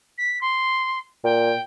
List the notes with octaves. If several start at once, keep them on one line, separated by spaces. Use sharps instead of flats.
B6
C6
A#2 G5